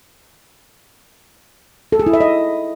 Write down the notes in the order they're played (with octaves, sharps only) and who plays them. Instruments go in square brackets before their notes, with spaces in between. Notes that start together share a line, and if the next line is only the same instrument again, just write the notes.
[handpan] A4
G#4
E4
E5
D#5